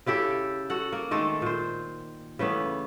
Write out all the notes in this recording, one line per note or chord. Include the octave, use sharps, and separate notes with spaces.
C#3 E4 G4 A4
F#4 A4 F#5
A#3
D#3 G#3 A3 A4
A#2 C5
C#3 E3 A3 B3